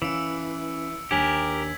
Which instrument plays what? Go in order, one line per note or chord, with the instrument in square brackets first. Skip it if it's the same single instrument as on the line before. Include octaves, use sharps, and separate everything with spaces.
[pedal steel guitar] E3 [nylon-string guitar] C#4 E5 F5 [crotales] E6 C#7 D7
[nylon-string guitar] D#2 D4 G#5 [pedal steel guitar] G4 A#4 [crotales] G#6 B6 F#7